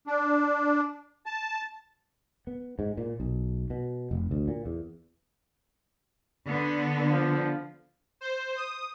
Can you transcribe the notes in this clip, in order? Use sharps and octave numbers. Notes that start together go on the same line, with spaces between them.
D4
A5
B3
G#2
A#2
B1
B2
F1
D2
A#2
E2
D3 B3
F3
C5
D#6